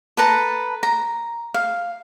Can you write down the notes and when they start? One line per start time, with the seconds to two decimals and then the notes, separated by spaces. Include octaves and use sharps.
0.17 A4 B4 A5 A#5
0.83 A#5
1.54 F5